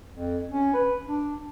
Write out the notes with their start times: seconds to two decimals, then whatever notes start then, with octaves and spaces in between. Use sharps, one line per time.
0.15 F2
0.52 C#4
0.74 B4
1.07 D4